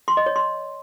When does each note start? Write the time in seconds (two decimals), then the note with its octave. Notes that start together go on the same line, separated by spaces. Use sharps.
0.08 C6
0.17 D#5
0.26 C#5
0.36 C6